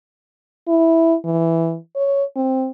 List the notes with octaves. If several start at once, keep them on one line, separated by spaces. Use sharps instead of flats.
E4
E3
C#5
C4